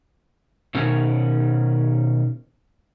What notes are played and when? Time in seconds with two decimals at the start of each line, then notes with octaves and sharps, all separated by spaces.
0.74 B2 D#3 C#4